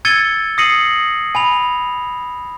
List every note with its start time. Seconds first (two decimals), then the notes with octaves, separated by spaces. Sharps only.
0.05 E6 G#6 A6 C#7 D#7 G7
0.58 D#6 A#6 C7 C#7 D#7 F#7
1.35 G#5 B5 F7